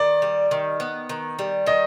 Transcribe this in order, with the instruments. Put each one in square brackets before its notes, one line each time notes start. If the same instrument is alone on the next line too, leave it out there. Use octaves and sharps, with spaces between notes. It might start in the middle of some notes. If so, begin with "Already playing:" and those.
Already playing: [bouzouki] D#3 [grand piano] D5
[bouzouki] G3
D#3
B3
D#3
G3
[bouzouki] D#3 [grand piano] D#5